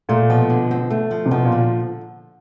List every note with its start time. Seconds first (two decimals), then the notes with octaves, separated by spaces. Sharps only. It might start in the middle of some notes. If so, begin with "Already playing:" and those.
0.09 A#2 A3
0.30 B2 F3
0.50 D3
0.71 C4
0.91 A3
1.11 F3
1.26 C3
1.31 B2 F3
1.45 A#2
1.52 D3